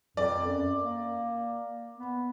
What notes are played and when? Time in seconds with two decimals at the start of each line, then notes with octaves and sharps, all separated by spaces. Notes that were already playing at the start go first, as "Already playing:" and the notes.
0.17 F2 D5
0.47 F#2
0.82 A#3
1.98 B3